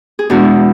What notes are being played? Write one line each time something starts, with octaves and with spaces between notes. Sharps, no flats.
G#4
E2 B2 G#3 D4 F#4